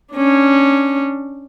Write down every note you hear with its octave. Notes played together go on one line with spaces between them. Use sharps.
C#4 D4